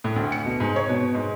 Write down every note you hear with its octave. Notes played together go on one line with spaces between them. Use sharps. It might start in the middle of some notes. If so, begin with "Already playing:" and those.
A2
D2
C#7
B2
G#2
C#5
B2
G#2